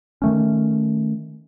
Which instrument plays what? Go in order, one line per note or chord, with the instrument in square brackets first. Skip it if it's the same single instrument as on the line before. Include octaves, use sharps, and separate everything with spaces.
[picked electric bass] D#3 A3 C#4